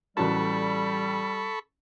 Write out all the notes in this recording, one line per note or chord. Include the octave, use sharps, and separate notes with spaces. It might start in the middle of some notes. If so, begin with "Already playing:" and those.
A1 F#3 G3 A4 A5 B5 C#6